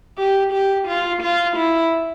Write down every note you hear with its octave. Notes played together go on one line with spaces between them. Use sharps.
G4
G4
F4
F4
E4